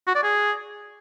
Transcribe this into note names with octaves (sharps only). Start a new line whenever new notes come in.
F#4
D5
G#4